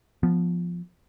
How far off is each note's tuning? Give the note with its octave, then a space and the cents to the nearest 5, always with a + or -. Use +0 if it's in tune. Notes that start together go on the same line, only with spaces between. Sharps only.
F3 +0 B3 +0